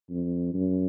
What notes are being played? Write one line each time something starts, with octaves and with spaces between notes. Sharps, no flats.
F2
F#2